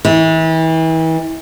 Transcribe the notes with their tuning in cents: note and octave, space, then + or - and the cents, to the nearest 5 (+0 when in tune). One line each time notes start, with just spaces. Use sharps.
E3 -35